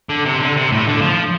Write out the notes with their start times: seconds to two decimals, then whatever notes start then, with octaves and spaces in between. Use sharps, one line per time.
0.09 D3
0.25 C3
0.40 D3
0.56 C3
0.72 A2
0.87 D3
1.02 F3